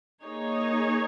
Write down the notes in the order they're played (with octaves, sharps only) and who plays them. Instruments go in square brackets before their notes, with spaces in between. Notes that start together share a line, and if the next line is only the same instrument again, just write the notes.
[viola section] A#3 D#4 G#4 C#5